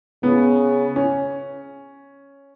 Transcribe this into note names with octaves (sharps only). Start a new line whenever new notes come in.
C#3 B3
C#4